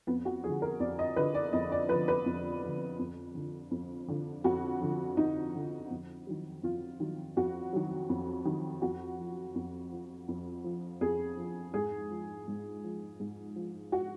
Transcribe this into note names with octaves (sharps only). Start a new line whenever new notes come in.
F2 B3
F#4
D3 F3 G#4
A#4
F2 D5
D#5
D3 F3 B4
D5
F2 D#5
D5
D3 F3 B4
B4
F2
D3 F3
F2
D3 F3
F2
D3 F3
F2 F#4
D3 F3
F2 D#4
D3 F3
F2
D#3 F#3
F2 F4
D#3 F#3
F2 F#4
D#3 F#3
F2
D#3 F#3
F2 F#4
F3
F2
F3
F2
F3
F2 G#4
F3
G#2 G#4
F3
G#2
F3
G#2
F3
F#4